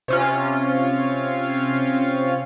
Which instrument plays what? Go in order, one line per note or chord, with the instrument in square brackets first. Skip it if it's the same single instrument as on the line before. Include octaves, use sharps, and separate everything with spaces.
[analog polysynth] C3 C#4 F4